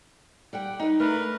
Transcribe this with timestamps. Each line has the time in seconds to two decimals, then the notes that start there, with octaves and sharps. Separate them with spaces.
0.53 G3 F#5 G5
0.80 D#4 B4
1.00 A3 D4 A#4 B4